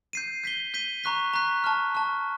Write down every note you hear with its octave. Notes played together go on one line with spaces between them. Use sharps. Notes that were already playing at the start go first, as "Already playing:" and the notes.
G6 C7 D#7
G6 B6 D#7 G7
G6 B6 D#7 G7
A#5 C#6 F#6 B6
A#5 C#6 F#6 B6
A5 C#6 F6
A5 C#6 F6